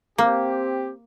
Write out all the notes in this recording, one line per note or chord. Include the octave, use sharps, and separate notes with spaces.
A#3 C4 G4